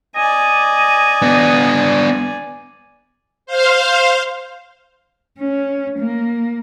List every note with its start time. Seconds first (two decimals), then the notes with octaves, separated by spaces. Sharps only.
0.16 D5 D#5 G#5
1.22 B3 D4
3.46 C5 F5
5.39 C#4
5.99 A#3